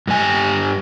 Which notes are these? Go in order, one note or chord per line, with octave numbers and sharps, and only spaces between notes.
G2 G3 G#5